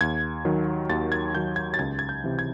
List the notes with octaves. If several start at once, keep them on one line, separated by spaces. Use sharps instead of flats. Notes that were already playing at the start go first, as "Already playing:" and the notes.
D#2 G#6
D#3 F#3
D#2 A6
G#6
D#3 F#3 G6
G#6
A6
C#2 G#6
G#6
G6
C3 E3
G#6